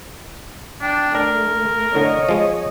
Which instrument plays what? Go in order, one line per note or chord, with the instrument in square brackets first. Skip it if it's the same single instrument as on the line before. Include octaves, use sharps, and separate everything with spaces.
[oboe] D4 [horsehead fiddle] G5
[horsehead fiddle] A3 [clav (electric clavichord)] D4 [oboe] A#4
[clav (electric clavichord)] A2 D3 [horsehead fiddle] C#5 D#5
[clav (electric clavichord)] F3 G#3